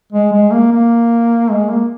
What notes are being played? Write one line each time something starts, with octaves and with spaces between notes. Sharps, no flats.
G#3
G#3
A#3
A#3
G#3
A#3